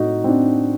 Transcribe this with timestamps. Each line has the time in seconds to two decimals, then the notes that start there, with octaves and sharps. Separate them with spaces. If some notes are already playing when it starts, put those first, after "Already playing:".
Already playing: A2 D#4 F#4
0.24 C4
0.29 D4